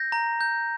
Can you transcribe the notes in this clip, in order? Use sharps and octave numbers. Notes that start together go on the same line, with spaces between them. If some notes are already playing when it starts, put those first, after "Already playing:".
Already playing: G6 A#6
A#5
G6